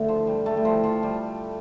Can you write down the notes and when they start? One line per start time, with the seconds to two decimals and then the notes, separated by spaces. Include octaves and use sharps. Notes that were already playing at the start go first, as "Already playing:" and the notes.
Already playing: D3 A3
0.08 F3
0.27 G3
0.46 A3
0.57 G3
0.65 F3
0.84 F3
1.03 G3